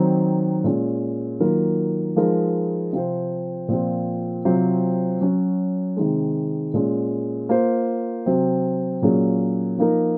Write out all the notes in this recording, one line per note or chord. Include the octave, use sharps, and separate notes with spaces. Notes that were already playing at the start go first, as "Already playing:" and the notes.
Already playing: D#3 F#3 C4 D#4
A#2 G#3 C#4
D#3 F#3 A#3 F4 A#4
F3 G#3 D#4 A#4
C3 F3 C4 F4 C5
A#2 F3 C4 F4
C3 F#3 C4 F4 C5
F#3 C#4 F#4
C3 D#3 G#3
A#2 G#3 C#4
A#3 F4 C5
C3 F#3 C4 F#4
A#2 F#3 A#3 C#4 G#4
F3 A#3 D#4 A#4